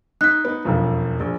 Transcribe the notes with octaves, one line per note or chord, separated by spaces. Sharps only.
D#4 F#6 B6
B3 D#4
E1 B1 F2
A#1